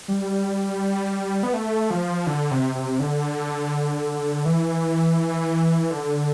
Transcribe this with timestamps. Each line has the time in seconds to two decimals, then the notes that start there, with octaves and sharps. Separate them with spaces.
0.08 G3
1.43 B3
1.54 A3
1.91 F3
2.27 D3
2.51 C3
2.75 C3
3.00 D3
4.46 E3
5.91 D3